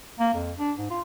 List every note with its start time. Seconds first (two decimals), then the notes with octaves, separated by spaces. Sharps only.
0.19 A#3
0.34 F2
0.58 D4
0.78 G#2
0.90 F4